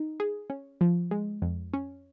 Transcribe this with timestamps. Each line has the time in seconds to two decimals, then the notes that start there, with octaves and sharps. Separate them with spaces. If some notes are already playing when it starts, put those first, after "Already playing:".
Already playing: D#4
0.20 G#4
0.50 C#4
0.81 F3
1.11 G#3
1.42 F2
1.74 C#4